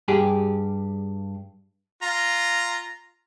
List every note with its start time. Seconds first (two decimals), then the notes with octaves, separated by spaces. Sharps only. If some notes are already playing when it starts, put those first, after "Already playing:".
0.08 G2 G4 G#4
2.02 F4 A#5